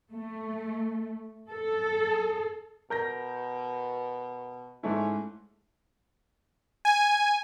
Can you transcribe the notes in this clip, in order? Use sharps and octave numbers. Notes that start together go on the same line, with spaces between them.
A3
A4
B2 A#4 G6 A#6
G#2 A3 C#4 E4
G#5